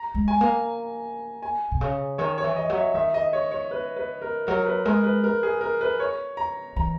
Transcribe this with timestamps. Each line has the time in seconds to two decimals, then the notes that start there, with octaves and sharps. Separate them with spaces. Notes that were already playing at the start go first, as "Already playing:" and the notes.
Already playing: A#5
0.14 G#3
0.28 G#5
0.41 A#3
1.43 G#5
1.72 B2
1.81 C#3
2.18 D#3 C#5
2.38 C#5
2.44 E3
2.56 D#5
2.70 F#3
2.75 E5
2.94 D#3 E5
3.14 D#5
3.33 C#5
3.51 C#5
3.71 B4
3.96 B4
4.22 A#4
4.47 F#3 A#4
4.66 B4
4.85 G#3 A#4
5.04 B4
5.24 A#4
5.43 G#4
5.61 A#4
5.81 B4
6.00 C#5
6.37 A#5
6.76 E3 A#5